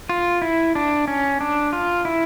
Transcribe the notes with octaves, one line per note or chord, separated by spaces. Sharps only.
F4
E4
D4
C#4
D4
F4
E4